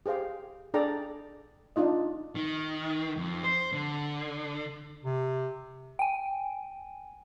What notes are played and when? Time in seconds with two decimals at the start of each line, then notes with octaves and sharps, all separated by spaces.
0.06 G4 G#4 C5 F5 G5
0.74 D4 G#4 A4 D5 G5 A#5
1.76 D4 D#4 F4 D#5
2.35 D#3
3.17 F2
3.43 C5
3.73 D3
5.04 C3
5.99 G5 G#5